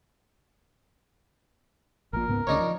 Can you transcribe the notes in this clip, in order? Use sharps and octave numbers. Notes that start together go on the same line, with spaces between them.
A#1 A#2 A#4
C#2 G#2 B3
D2 C#3 D4 D#4 C#5
F3